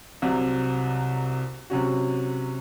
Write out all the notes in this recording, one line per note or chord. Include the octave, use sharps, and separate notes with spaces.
C2 C3 F#3
C3 F#3 C#4 F#4